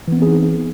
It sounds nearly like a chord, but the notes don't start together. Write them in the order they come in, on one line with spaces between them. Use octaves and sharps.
E3 B3 C4 G#4 D#4